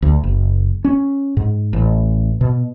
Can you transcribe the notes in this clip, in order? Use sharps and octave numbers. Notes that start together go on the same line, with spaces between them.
D2
F#1
C#4
G#2
A1
B2